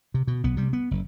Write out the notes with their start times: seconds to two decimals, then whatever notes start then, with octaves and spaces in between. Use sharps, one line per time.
0.14 C3
0.27 B2
0.44 B1 B3
0.57 C3 G3
0.73 B3
0.91 F#1